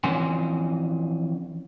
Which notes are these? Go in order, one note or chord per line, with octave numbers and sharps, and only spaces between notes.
E3 F3 C4 C#4 G#5 C6